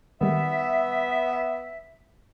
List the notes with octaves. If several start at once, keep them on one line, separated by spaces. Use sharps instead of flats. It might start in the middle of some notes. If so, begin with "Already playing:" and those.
D#3 G3 B3 E5